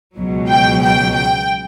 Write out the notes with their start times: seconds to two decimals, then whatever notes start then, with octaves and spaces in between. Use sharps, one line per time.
0.16 C#2 B2 F#3
0.49 G5
0.81 G5
1.14 G5